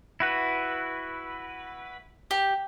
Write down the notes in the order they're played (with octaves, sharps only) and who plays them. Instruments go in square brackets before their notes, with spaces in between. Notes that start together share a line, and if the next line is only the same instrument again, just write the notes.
[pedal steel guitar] E4 F#4 B4
[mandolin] G4